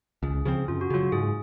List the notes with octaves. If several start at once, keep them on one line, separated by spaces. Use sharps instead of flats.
C#2 G#4
C#3 F3 C4 G#4
F#2 F4
F#4
C#3 F#3 F4
G#2 G#4